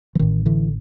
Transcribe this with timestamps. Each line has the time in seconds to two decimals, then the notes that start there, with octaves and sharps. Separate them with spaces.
0.15 E3
0.19 A1 A2 D#3
0.46 D3 E3